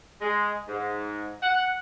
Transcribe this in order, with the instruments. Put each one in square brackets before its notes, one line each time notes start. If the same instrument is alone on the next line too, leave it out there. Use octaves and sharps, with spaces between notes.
[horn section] G#3
G#2
F#5